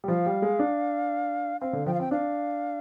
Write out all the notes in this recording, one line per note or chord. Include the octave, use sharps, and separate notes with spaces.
G3
F3 F5
G3
G#3
D4
C4 F5
D3
F3 G5
F5
C4 G5
D4 F5